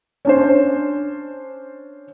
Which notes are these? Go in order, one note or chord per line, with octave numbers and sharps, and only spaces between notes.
C#4 D4 C5